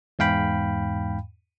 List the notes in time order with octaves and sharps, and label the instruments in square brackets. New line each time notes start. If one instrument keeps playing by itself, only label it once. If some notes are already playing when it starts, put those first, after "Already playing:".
[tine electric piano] E2 G#2 F5 G5 B5